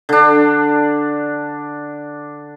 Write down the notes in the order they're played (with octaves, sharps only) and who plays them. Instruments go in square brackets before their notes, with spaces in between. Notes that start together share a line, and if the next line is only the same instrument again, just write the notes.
[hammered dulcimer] D3 D4